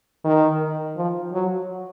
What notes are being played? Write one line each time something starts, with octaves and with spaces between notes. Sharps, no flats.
D#3
F3
F#3